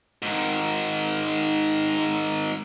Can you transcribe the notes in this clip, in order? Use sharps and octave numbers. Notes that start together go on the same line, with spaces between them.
G#2 D#3